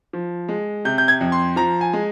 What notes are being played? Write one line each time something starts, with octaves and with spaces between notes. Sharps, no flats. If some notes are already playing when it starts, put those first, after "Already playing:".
F3
G#3
C3 G6
G6
G#6
F2
C6
F3 A#5
G#5
G#3